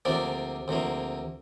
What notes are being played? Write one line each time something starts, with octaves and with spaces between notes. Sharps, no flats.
D2 C3 F3 A#3 D4 D5
D2 C3 F3 A#3